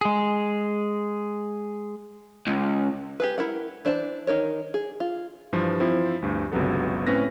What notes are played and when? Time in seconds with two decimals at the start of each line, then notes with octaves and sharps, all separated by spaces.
0.01 G#3 G#4
2.47 C#2
3.20 G4 G#4 B4
3.38 E4 A#4 F#5
3.85 E3 D4 C5 A5
4.27 D#3 D#4 A#4 C#5
4.74 G#4
5.00 F4
5.53 G2 E3 F3 F4
5.80 F3 C4 E4
6.22 D2 G2
6.52 G1 C#2 C3 F#3 B3 A4
7.07 A2 C4 C#4 B4 A#6